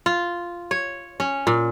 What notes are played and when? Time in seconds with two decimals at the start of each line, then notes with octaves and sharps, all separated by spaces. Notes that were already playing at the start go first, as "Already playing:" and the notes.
0.06 F4
0.71 C#5
1.20 C#4
1.47 A#2